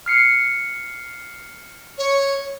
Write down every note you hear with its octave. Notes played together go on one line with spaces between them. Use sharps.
F6 C7 C#7
C#5